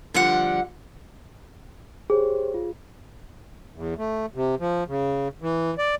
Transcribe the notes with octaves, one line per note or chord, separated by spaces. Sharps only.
D3 F3 G3 F#5
G4 G#4 C5 C#5
F4
E2
A3
C3
F3
C#3
E3
D5